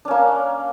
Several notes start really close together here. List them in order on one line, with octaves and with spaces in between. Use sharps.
D4 C#4 A#3